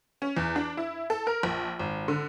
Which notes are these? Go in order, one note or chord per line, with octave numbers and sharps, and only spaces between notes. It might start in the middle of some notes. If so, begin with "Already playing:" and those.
C#4
E2
D4
E4
A4
A#4
A#1
G#1
D3